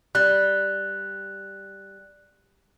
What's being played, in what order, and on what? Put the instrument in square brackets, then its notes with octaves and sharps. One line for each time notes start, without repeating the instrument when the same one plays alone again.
[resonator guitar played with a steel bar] G3 [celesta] F#6